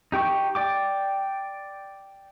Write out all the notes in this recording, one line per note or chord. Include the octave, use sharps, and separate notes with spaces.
D#4 G4 G5 C#6
D5 G5 D6